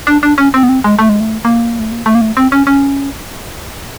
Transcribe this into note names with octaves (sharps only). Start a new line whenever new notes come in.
D4
D4
C#4
C4
B3
C4
G#3
A3
G#3
A3
A#3
A3
A#3
A3
A#3
A3
C4
C#4
C#4